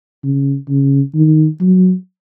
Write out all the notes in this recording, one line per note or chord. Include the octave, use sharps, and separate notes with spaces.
C#3
C#3
D#3
F#3